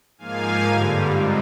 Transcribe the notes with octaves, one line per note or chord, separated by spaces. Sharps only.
G#2 F3 A#3 F5 G#5
G2 D3 G3
G#2 F3 C4 D#4